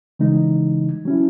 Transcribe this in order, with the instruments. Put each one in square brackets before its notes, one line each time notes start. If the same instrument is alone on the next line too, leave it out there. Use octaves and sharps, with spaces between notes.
[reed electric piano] C#3 E3 G#3 D#4
F#3 C#4 E4